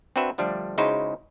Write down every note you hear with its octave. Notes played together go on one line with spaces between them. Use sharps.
C4 D4 F#4 B4 E5
D3 F3 G3 A3 D4
C#3 G#3 D#4 E4 F#4 C5